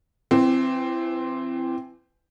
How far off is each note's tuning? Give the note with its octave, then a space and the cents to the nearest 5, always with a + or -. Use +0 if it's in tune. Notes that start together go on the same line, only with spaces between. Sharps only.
E3 +25 C4 +0